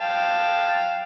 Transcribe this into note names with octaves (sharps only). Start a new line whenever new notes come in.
F5 G5 A5